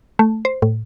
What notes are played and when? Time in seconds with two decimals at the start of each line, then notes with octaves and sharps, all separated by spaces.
0.19 A3
0.45 C5
0.62 A2